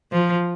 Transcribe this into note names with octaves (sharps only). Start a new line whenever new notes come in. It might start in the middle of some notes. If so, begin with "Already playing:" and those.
F3